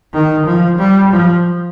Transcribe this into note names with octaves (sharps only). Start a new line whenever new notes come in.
D#3
F3
G3
F3